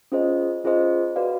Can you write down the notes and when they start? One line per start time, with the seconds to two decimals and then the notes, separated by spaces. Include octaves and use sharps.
0.12 C#4 F4 G#4 C5 D#5
0.64 C#4 F4 G#4 C5 D#5
1.16 F#4 B4 D5 F5